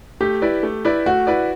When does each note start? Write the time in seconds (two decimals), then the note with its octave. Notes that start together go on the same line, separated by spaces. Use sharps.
0.20 A3 G4
0.42 E4 B4 D5
0.63 A3
0.85 E4 B4 D5
1.06 A3 F#4
1.27 E4 B4 D5